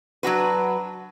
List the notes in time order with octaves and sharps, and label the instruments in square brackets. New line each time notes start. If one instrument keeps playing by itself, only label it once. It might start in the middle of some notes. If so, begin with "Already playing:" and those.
[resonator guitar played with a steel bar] F#3 D4 F#4 B4